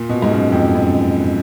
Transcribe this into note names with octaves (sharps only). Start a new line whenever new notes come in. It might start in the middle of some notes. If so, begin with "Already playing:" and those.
Already playing: A#2
B2
G#2
F#2
F2
F#2